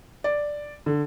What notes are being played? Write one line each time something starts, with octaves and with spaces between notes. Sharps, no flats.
D5
D3